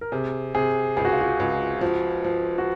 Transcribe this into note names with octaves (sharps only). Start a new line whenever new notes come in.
A#4
C3 G#4
C3 G#4
C#2 G#4
F#4
F4
F#4
C#2
F3 F#4
F3
F#4